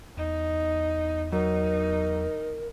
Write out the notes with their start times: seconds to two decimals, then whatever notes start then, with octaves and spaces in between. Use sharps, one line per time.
0.17 E2 D#4
1.32 F#3 D#4 A#4